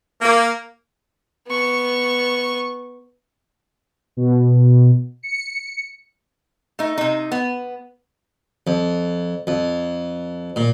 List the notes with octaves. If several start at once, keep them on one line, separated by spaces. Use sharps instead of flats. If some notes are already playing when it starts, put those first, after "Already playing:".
A#3
B3 C#6
B2
C#7
A3 D#4
C3 D#4
B3
F2
F2
A#2